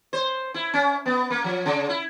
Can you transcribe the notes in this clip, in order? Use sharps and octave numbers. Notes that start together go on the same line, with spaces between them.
C5
E4
C#4
B3
A#3
F3
C#3
E4